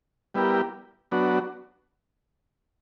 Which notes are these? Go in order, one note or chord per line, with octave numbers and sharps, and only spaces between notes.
G3 B3 E4 G4 A#4
F#3 B3 D4 F#4